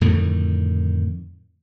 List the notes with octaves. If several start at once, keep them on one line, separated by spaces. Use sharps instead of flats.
F2 A2 D3 D#3